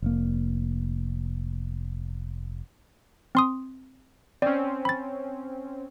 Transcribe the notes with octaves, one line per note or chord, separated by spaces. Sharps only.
F1 A#3
C4 C6 D#6
C4 C#4 D5
B5 A6